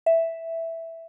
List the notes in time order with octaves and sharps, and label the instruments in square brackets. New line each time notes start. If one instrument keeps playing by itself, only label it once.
[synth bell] E5